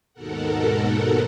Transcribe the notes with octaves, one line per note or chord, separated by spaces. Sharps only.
D#2 G#2 B2 A4 A#4 F#5